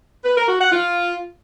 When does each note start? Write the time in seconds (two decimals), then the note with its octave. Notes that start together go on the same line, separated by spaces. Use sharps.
0.24 B4
0.36 A#4
0.48 F#4
0.59 F#5
0.71 F4